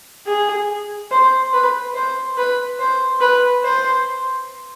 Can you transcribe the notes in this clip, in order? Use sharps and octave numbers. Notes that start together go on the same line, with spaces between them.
G#4
C5
B4
C5
B4
C5
B4
C5